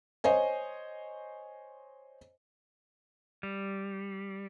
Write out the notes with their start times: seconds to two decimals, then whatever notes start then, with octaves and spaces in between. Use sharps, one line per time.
0.24 C5 C#5 D#5 G#5
3.43 G3